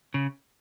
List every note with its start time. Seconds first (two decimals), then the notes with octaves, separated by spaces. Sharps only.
0.14 C#3